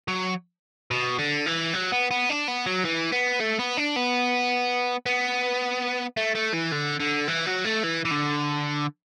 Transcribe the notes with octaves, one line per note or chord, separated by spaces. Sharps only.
F#3
B2
D3
E3
F#3
B3
B3
D4
B3
F#3
E3
B3
A3
B3
D4
B3
B3
A3
A3
E3
D3
D3
E3
F#3
A3
E3
E3
D3